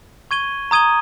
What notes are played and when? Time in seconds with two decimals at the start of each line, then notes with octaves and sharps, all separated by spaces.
0.31 C#6 G#6 D#7 G7
0.71 A#5 D#6 G#6 D#7 G7